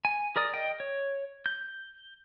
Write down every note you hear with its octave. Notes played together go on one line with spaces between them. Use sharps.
G#5
G#4 A#4 D5 D#6
D#5 G5
C#5
G6